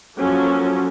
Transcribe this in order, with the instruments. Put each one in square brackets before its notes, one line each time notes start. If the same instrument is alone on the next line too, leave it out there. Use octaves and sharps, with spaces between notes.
[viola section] F3 F#3 A#3 C#4 A4